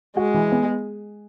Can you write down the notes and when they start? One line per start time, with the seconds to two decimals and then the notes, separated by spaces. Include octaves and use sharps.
0.17 G#3 F#4
0.34 E3
0.52 B3